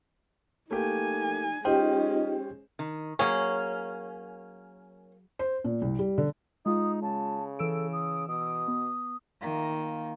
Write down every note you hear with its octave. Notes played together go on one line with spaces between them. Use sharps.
A3 A#3 D#4 G4 G#5
G#3 C#4 D#4 F4 G4 C5 D#5 G5
D#3
F#3 A#3 C#4 G#4 C#5
C5
A#2
C2
G3
D3
G#3 D#4 F4 D#6
C#3 A5
E3 A4 E6 D7
D#6
B2 D#6
B3
D#3 A#3 F4